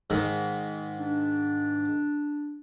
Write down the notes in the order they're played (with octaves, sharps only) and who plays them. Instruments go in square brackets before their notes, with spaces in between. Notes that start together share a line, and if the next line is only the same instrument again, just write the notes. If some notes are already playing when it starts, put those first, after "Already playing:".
[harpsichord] G#2 D#3
[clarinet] D4